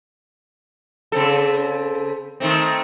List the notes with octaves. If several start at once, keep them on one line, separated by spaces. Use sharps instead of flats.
C#3 C4 A4
D#3 A3 C4